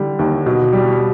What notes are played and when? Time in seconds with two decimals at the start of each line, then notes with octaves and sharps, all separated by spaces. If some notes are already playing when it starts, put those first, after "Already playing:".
Already playing: D3 G3
0.19 D#2
0.46 B2
0.73 G3